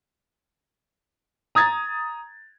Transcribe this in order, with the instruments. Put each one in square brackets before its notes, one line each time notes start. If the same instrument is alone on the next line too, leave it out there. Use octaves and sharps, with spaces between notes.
[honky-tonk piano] A#5 D#6 G#6 A6